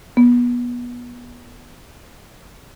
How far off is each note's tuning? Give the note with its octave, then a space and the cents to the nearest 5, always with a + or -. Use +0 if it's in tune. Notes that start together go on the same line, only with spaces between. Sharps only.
B3 -25